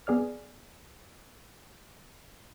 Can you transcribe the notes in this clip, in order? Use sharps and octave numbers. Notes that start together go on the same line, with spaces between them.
B3 G#4 D5 F6